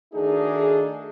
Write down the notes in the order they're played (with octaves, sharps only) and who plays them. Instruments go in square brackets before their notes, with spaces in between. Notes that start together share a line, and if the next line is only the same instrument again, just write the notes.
[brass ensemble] D#3 A3 D4 D#4 F#4 G#4